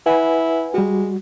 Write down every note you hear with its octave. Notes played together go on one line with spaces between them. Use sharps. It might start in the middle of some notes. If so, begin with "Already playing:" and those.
E4 B4 F#5 G#5
G3 G#3 F#4